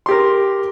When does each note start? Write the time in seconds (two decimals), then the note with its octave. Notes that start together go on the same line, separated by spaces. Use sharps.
0.06 C6
0.09 G4
0.11 A#4